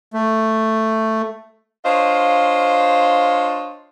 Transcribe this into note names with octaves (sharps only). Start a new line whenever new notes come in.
A3
D4 F4 C5 C#5 D#5 F5